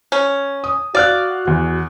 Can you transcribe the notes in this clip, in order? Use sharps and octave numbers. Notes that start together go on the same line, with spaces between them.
C#4
D#6
F#4 D5 F5 F6 F#6
E2 F#4